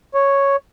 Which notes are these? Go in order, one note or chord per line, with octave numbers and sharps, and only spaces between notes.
C#5